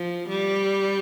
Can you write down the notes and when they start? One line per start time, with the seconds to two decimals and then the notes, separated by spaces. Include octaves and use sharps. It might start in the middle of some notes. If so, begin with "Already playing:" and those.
Already playing: F3
0.29 G3